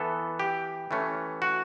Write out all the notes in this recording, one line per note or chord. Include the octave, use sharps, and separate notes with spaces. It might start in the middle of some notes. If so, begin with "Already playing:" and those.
Already playing: E3 B3 A4
G4
E3 A3 C#4
F#4